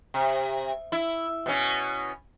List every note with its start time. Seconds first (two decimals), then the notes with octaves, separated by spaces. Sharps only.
0.14 C3
0.92 E4
1.46 B2 C#4